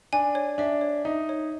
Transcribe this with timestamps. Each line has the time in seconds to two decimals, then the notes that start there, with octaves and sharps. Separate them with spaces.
0.13 D4 G#5
0.35 C#5
0.58 D4 E5
0.81 C#5
1.05 D#4 E5
1.29 C#5